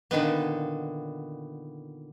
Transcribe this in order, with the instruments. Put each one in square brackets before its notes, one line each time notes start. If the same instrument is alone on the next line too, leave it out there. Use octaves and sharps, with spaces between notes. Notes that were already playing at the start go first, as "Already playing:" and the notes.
[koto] A#2 D3 D#3 B3